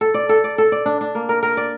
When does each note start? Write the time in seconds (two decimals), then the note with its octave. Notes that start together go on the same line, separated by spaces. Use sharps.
0.01 A4
0.14 D5
0.29 A4
0.44 D5
0.58 A4
0.72 D5
0.86 D4
1.01 D4
1.15 A#3
1.29 A#4
1.43 A#4
1.57 D5